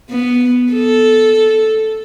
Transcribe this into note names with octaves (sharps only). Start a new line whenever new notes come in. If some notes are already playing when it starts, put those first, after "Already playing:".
B3
A4